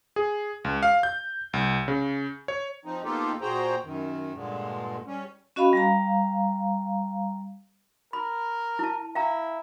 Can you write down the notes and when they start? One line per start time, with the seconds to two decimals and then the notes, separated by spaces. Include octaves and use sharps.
0.16 G#4
0.65 C#2
0.83 F5
1.03 G6
1.53 C2
1.88 C#3
2.48 C#5
2.85 F3 C4 D#4
3.04 A#3 B3 D#4 F4 G4 A4
3.41 A#2 F#4 G#4 C5 G5 A#5
3.84 F#2 D#3
4.35 G2 A#2 D3 G#3
5.06 G3 C#4
5.56 C#4 F#4 D#5 F5 B5
5.73 G3 F5 A#5
8.13 A#4 B5
8.79 E4 A5
9.15 E4 F5 G5 A#5